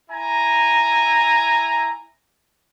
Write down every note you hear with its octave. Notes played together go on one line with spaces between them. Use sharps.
E4 G#5 A#5